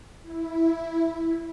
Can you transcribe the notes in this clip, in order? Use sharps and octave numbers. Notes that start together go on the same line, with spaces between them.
E4